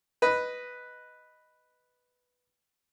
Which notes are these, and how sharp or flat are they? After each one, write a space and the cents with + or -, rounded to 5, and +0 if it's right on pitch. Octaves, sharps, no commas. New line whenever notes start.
B4 +0 D#5 +0